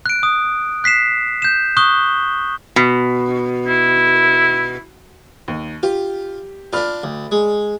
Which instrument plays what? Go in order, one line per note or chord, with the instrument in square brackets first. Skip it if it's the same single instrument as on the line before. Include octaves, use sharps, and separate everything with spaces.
[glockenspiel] F#6 D7
D#6
F#6 B6 C7 E7
G6 E7
C#6 D#6 F#6 G7
[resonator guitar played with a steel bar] B2
[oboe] E4
[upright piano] D#2
[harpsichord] F4 [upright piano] G4
[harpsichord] D4 F4 [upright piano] D5 B5 F6
[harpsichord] D2
G#3